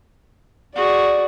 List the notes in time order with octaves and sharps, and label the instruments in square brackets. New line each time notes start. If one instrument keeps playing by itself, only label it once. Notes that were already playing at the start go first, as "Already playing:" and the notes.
[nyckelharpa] F#4 G#4 [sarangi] D5